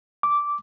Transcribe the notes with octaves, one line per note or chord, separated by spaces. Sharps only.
D6